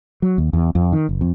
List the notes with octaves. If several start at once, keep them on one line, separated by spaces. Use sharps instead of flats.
F#3
D#2
E2
F2
D#3
F#1
F2